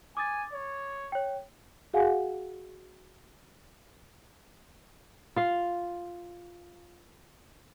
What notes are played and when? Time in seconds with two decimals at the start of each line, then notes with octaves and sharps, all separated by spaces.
0.17 G#5 D6 D#6 A6
0.53 C#5
1.12 C#5 G5
1.93 F#4 G#4 F5 F#5 G#5
5.36 F4 F5